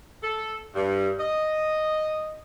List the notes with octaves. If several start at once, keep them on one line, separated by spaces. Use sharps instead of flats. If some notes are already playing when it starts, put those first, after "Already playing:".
A4
G2
D#5